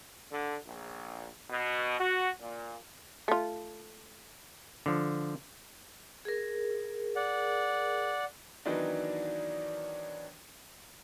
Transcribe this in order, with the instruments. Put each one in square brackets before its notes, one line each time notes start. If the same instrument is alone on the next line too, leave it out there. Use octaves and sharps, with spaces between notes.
[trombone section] D3
A#1
B2
F#4
A#2
[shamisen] A3 F4
[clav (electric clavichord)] D3 F3
[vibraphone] G#4 A#4
[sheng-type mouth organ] D5 F#5
[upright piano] D#3 E3 F#3 B3 D4 D#4